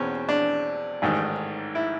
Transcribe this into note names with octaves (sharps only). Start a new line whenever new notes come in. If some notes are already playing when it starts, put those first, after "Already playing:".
Already playing: E2 B2 C4 C#4
D4
A1 G#2 D#3
E4